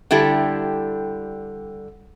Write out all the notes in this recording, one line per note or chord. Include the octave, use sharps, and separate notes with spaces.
D3 G3 E4 G4 A4